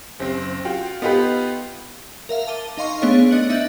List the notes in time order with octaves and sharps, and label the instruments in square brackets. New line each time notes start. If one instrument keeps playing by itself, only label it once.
[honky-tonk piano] F#1 C4
F4 F#4 G5
B3 D#4 F4 G4 B4
[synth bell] A#4 E5 F5
A5 D6 D#7 G7
D#4 D#5 F5 C6 C#6
A3 B3 D4 G#4 C#5 F5
D4 D#5 F#6 C#7 F#7
D#4 E5 F#6 G6 A6 F#7